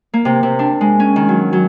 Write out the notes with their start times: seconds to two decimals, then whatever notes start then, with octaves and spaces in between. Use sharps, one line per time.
0.14 A#3
0.25 C3
0.43 C3
0.59 D4
0.81 G#3
1.00 C#4
1.16 D#3
1.29 F#3
1.53 F#3